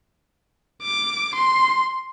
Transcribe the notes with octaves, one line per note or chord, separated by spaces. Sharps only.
D6
C6